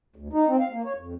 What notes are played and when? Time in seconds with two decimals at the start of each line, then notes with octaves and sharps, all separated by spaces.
0.16 D2
0.33 D#4
0.48 C4
0.60 F5
0.73 A#3
0.85 C#5
0.98 F2